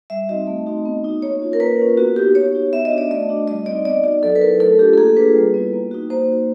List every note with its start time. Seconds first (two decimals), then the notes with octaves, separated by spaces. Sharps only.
0.10 G3 E5
0.29 C4 D#4 F#4 D#5
0.47 A3
0.66 C4 D#4 F#4
0.85 B3
1.04 D#4 F#4
1.22 A#3 C#5
1.42 C#4 F4
1.53 A#4
1.60 A#3 B4
1.79 C#4 F4
1.97 B3 F#4
2.16 F#4 G4
2.19 D#4
2.35 B3 C#5
2.54 D#4 F#4
2.73 B3 E5
2.85 D#5
2.91 D4 F#4
2.98 D5
3.10 A3 D#5
3.29 D4 F#4
3.48 G3 D#5
3.66 C4 D#4 D5
3.85 B3 D5
4.04 D#4 F#4 D5
4.23 F#3 A4
4.36 B4
4.42 B3 E4 A#4
4.60 A3 A4
4.79 D4 F4 G4
4.93 A4
4.97 A#3 G#4
5.17 D4 F4 B4
5.35 G3
5.54 B3 E4
5.73 A#3
5.91 D#4 F#4
6.10 A#3 C5
6.29 D#4 F#4